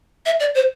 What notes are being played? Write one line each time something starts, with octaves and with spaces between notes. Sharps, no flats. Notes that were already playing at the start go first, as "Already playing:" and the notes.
E5
D5
C5